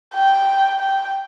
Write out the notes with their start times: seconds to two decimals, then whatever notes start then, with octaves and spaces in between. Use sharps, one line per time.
0.15 G5
0.80 G5